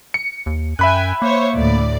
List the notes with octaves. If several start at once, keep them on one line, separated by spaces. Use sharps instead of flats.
C#7
D#2
F#2 E5 G5 G#5 B5 F#6
A#3 C5 C#5
D2 A2 D5